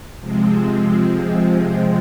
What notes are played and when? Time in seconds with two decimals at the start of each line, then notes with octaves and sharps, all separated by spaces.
0.20 C3 F3 G#3 C4